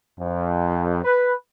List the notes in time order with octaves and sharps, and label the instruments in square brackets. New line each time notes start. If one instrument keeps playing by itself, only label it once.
[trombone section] F2
B4